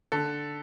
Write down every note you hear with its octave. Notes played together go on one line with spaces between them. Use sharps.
D3 A4